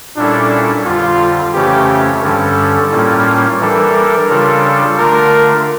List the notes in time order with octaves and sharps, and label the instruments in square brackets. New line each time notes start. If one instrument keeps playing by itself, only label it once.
[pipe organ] A#2 G3 C#4 E4 A4 [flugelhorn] D4
[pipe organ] F2 D3 G3 [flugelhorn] F4
[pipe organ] F2 C#3 E3 A3 C#4 [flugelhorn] G4
[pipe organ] G2 D3 G3 C#4 [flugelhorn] A4
[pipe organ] A2 G3 A#3 C#4 F4
[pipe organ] E3 G3 D4 A4 [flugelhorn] A#4
[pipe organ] C#3 G3 D4 F4 A4
[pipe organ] D3 A3 D4 F4 [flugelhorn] A#4